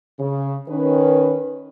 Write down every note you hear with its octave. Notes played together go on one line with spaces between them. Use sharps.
C#3
D#3 C#4 B4